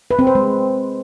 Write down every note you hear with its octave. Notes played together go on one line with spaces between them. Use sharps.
B4
C4
C5
G#3